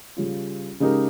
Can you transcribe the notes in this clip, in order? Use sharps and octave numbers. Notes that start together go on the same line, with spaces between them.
C#3 G3 C#4 F4
C#3 G#3 D#4 G4 A#4